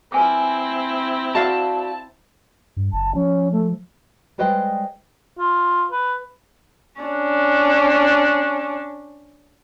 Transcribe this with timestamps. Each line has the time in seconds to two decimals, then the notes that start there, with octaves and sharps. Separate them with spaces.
0.12 C4 E4 B4 G#5 D6
1.35 F#4 D5 F5 A5
2.77 G2
2.93 F#1 A5
3.15 F3 C#4
3.52 A3
4.38 G3 G#3 B4 C5 D#5 G5
5.39 F4
5.91 B4
7.01 C#4 D4